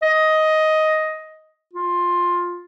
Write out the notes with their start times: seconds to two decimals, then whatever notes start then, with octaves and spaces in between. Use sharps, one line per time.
0.02 D#5
1.73 F4